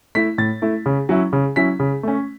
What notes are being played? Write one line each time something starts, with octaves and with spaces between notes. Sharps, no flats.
A3 E4 B6
A2 A6
A3 E4
C#3
F#3 C#4 E4
C#3
F#3 C#4 E4 B6
C#3
A3 C#4